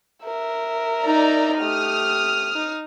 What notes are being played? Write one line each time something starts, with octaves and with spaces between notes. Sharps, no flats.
A#4 E5
D#4 D5 A#5
A3 G4 D#6 F6
D#4